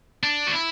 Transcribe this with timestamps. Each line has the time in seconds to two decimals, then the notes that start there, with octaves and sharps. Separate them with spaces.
0.23 D4
0.47 F#4
0.53 E4